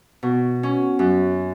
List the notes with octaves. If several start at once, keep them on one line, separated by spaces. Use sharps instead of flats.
B2
C#4
F#2